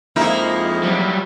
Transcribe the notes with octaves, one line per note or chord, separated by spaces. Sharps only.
F2 F3 G#3 A#3 D#4 E4
F#3 G3